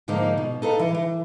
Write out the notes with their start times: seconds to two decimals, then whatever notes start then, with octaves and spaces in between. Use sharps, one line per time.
0.08 G#2 D3 F3 A#3 D#4
0.37 B2
0.62 D#4 A4 B4 F5
0.79 E3
0.94 E3